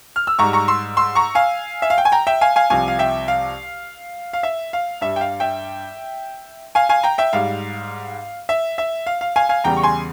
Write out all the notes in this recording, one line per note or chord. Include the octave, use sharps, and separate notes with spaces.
F6
E6
G#2 G3 A#5 C#6
A#5 C#6
C6 E6
C6 E6
A#5 C#6
F5 G#5
E5
F5
G5
G#5
G5 A#5
E5 G5
F5 G#5
F5 G#5
C2 C3 F3 F5 G#5
F5
E5 G5
F5
F5
E5
F5
G2 G3 E5
G5
F5
E5 G5
F5 G#5
F5 G#5
G5 A#5
E5 G5
G#2 G3 F5
E5
E5
F5
F5
F5 G#5
F5 G#5
E2 C#3 G3 G5 A#5
C#6
G#5 C6